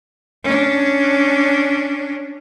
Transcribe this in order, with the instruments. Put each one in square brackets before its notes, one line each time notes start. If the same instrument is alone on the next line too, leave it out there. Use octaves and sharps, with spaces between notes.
[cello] C#4 D4